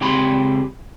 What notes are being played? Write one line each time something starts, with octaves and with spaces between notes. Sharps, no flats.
C#2 C4 G4 G#4 B5 C6